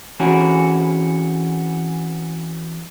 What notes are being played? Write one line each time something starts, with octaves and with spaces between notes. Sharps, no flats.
E3 C4 C#4 F#4 G#4